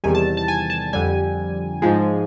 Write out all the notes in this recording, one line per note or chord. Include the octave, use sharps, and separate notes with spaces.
E2 C3 D#3 G3 G#5
A5
A5
G#5
A5
F2 D3 G3 G#5
G#2 F3 G#3